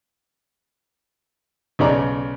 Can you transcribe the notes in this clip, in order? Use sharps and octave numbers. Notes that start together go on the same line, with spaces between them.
B1 C#3 C#5 D5 A#5